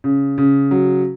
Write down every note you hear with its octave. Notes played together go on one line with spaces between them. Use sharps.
C#3
C#3
F#3